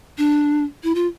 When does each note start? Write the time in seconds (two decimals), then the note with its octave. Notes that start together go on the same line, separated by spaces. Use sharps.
0.18 D4
0.83 E4
0.95 F4